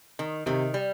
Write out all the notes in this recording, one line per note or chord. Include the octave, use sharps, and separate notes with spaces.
D#3
C3 D#3
G3